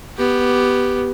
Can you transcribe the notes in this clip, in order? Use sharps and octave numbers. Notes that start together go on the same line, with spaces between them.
B3 G4